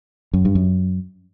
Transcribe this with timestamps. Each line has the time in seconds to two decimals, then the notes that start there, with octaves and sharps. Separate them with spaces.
0.33 F#2
0.45 G2
0.55 F#2